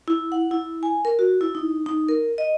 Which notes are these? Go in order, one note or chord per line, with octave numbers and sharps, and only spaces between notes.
E4
F#5
E4
G#5
A#4
F#4
E4
D#4
D#4
A#4
D#5